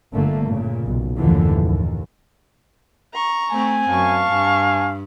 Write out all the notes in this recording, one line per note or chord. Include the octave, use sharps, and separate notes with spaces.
G1 D3 A3 A#3
A#2 C#3
B1
F#1 D#2 A2 D3 E3 F3
D#2
A#5 C#6
A3 C4 G#5
F#2 F5 A5 C#6
G2 G#5